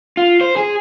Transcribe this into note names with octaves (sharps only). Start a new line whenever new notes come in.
F4
C5
G#4